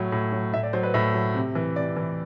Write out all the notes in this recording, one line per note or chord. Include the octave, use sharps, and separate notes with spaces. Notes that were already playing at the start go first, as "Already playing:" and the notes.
Already playing: A2 F#3
A2
F#3
A2 E5
D5
F#3 C5
B4
A2 E5
F#3
C3
E3
C3 D5
E3